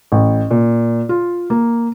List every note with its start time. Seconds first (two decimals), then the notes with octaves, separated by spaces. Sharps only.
0.12 A1
0.51 A#2
1.09 F4
1.50 A#3